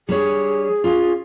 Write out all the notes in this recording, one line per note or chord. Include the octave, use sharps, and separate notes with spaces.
G3 D4 G#4 C#5
C#4 F4